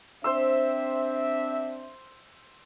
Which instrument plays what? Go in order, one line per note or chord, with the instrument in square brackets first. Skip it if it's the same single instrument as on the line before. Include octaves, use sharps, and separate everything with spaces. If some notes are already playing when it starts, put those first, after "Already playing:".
[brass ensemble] C4 D4 E5 [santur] C5 C6 E6